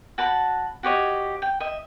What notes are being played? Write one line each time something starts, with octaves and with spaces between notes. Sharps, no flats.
F#4 A5 B5
F#4 G4 C#5 D#5
G5
D#5 E5